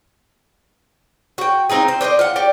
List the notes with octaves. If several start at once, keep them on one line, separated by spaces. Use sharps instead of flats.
F#4 G5
C4 D#4 F4 G#4
C5
D4 C5 C#5 D#5
F4 F#5
G4 D5